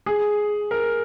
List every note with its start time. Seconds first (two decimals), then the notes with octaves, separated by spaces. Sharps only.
0.06 G#4
0.71 A#4